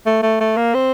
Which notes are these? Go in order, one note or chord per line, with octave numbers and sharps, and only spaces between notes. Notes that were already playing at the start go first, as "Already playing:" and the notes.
A3
A3
A3
A#3
C4